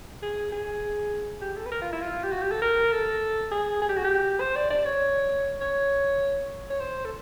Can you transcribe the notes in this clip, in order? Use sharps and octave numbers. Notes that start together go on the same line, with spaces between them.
G#4
G#4
G4
A4
B4
A#4
F4
E4
F4
G4
F#4
G4
A4
A#4
A4
G#4
G#4
G4
F#4
G4
C5
D5
D5
C#5
C#5
C#5
C5
A4